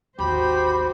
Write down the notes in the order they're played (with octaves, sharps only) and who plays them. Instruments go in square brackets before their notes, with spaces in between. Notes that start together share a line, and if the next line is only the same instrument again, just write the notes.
[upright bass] G#1 D#2 [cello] F#4 C5 [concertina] G4 G5 [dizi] B5